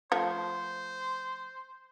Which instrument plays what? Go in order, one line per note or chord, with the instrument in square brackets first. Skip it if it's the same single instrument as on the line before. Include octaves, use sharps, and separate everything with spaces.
[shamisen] F3 A3 [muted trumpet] C5